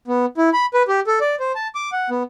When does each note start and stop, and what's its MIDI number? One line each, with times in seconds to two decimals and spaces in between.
0.08 0.26 59
0.37 0.50 64
0.53 0.66 83
0.74 0.83 71
0.88 1.00 67
1.07 1.19 69
1.21 1.35 74
1.40 1.52 72
1.55 1.68 81
1.75 1.90 86
1.92 2.10 78
2.10 2.23 59